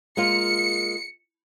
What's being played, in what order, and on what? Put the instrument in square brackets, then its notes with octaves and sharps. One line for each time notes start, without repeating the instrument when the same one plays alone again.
[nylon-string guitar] G#3 A#3 F4 [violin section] C#7